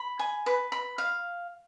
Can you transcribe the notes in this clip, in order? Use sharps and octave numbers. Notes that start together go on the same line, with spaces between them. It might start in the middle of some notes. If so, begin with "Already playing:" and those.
Already playing: B5
G#5
B4
B5
F5